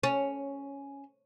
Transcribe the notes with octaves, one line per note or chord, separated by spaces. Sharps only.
C#4